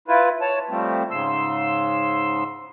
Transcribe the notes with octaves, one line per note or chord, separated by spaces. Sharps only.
E4 F4 B4
C#5 A5
F3 G3 A3 C4
G#2 C#3 C6 E6